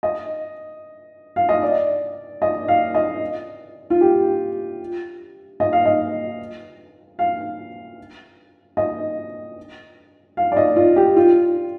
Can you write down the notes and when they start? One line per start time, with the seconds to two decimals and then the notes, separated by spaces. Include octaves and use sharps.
0.03 D#5
1.36 F5
1.49 D#5
1.62 D5
2.42 D#5
2.68 F5
2.94 D#5
3.90 F4
4.01 G4
5.60 D#5
5.73 F5
5.86 D#5
7.19 F5
8.77 D#5
10.37 F5
10.52 D5
10.57 D#5
10.76 F4
10.96 G4
11.17 F4